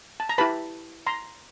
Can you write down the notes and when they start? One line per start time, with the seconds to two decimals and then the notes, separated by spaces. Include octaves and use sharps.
0.20 A5
0.29 A#5
0.38 E4 G4 B4 A5 B5
1.07 A#5 C6